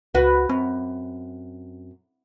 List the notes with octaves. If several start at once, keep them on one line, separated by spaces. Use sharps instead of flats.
C#2 F#4 B4
F#2 C4